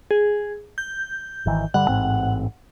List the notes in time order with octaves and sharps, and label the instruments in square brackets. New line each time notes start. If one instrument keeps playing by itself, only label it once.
[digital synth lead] G#4
G6
[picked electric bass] G#1 D#3 E3
[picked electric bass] G2 D3 G3 [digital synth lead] F#5
[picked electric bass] A1 G#2 C4